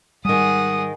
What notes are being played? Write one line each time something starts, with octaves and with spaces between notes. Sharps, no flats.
G#2 D#3 G3 G#4 F#5 D#6